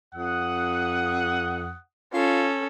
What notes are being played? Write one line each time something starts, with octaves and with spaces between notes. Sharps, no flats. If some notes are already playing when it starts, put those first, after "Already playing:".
F2 F#5 D#6
C#4 F4 A4